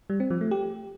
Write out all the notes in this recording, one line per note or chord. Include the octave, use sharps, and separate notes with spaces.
G3
C4
F3
A3
G4